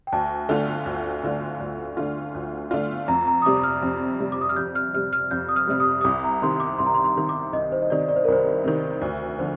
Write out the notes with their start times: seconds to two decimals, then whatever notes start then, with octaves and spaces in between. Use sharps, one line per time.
0.07 G5
0.12 D2 A5
0.49 D3 A3 D4 F4
0.86 D2
1.24 D3 A3 D4 F4
1.60 D2
1.97 D3 A3 D4 F4
2.35 D2
2.71 D3 A3 D4 F4
3.08 F2 A#5
3.27 A#5
3.42 D#6
3.45 C3 G3 D6
3.63 F6
3.83 F2
4.20 C3 G3
4.32 D6
4.41 D#6
4.49 F6
4.56 F2 G6
4.75 F6
4.94 C3 G3 F6
5.13 F6
5.31 F2 G6
5.49 D#6
5.56 F6
5.67 C3 G3 F6
5.80 D#6
6.01 D#6
6.04 C2 D6
6.24 A#5
6.42 C3 D#3 C6
6.60 D6
6.79 C2 C6
6.86 A#5
6.94 C6
7.04 C6
7.16 C3 D#3
7.29 D6
7.53 C2 D#5
7.72 C5
7.82 D#5
7.90 C3 D#3 D5
8.09 D5
8.16 C5
8.24 A#4
8.28 C2 C5
8.64 C3 D#3
9.01 D2
9.39 D3 F3